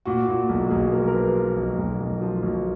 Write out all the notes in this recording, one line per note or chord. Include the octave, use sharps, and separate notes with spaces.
A#2 F#4
A#2
B1
B1 G#4
F3 A#4
A#4
F3 B4
F3
B1
B1
B1
F3
B1